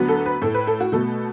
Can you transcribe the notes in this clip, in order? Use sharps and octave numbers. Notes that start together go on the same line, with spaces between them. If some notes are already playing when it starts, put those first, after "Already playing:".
Already playing: D2 D3 F#3 B3
A4
B4
A2 A3 A4
B4
A4
F#4
B2 A3 A4